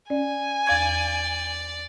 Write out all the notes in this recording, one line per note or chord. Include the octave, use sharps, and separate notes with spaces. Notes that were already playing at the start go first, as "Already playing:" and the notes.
C#4 D5 G#5
E2 D5 F5 G#6